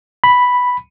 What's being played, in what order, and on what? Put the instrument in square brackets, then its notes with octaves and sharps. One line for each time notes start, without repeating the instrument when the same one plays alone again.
[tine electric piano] B5